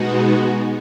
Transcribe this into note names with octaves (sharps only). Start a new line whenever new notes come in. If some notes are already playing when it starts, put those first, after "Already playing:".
Already playing: B2 G#3 B3 D#4 F#4